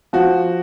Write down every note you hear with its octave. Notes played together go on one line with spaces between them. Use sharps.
F3 F#4